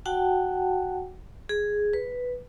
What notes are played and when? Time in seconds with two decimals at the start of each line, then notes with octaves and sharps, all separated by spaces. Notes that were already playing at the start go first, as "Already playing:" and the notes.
0.06 F#4 F#5 G5 A5
1.49 G#4
1.93 B4